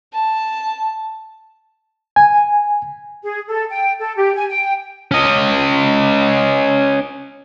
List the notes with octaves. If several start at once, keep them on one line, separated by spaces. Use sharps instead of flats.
A5
G#5
G#4
A4
G5
A4
G4
G#5
G5
C#4 D#5